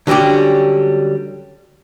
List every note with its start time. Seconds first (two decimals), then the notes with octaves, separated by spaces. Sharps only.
0.07 D3 F#3 G3 C#4 G4